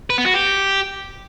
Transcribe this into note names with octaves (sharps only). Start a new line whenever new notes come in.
B4
B3
F#4
G4